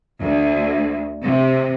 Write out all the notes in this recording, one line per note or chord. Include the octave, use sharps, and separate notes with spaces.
D2
C3